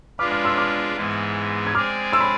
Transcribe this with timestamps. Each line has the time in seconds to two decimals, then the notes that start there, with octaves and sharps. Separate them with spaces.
0.19 G#3 D4 F4 B4 D6 F6
0.31 D6 F6
0.44 C6 E6
0.57 D6 F6
0.96 G#2 E3 G#3 B3
1.67 G#6
1.74 G#3 C4 G#4 D5 D6 F6
2.12 C6 E6
2.20 B5